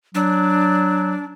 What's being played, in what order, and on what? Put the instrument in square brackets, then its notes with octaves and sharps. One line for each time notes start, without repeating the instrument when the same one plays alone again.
[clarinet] F#3 [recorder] D4